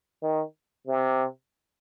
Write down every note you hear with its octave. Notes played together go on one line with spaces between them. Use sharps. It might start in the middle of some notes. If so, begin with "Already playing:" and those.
D#3
C3